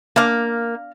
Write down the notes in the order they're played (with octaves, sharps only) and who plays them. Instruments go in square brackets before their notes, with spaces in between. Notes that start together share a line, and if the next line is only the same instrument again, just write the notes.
[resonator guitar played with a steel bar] A#3 [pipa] D4 F5